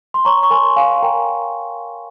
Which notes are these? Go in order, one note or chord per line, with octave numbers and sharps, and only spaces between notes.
C6
C#5 A#5 C#6
C#6
A#4 G#5 C6
C#5 F5 G#5
G#5
A#4 G5 A#5